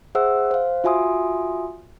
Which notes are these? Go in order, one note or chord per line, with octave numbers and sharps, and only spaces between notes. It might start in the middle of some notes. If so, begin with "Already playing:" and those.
G#4 C5 E5 F#5 E6
C5 F5
F4 F#4 E5 G#5 C6 D#6